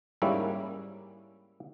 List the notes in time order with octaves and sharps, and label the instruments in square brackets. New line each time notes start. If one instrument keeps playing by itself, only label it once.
[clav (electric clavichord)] G#2 G3 A#3 C#4 E4